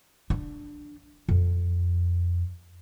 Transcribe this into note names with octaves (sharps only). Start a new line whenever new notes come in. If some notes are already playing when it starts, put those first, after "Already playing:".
D4
F2